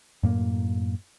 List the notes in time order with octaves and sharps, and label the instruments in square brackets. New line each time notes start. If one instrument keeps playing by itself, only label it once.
[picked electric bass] F#2 A2 A#3